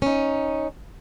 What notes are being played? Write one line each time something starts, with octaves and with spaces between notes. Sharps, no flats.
C#4 D#4